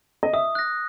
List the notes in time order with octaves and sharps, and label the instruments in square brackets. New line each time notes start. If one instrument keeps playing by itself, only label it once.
[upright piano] D#5
[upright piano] E5 [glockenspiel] D#6
[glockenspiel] F#6 A#6